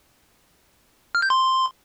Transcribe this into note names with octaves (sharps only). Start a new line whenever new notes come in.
F6
G6
C6